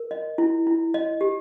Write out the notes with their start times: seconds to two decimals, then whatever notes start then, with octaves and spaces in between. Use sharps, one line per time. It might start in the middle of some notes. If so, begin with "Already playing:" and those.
Already playing: A#4
0.11 D#5
0.38 E4
0.67 E4
0.94 D#5
1.21 G4